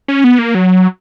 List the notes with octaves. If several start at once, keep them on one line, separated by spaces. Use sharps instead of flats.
C#4
B3
A#3
F#3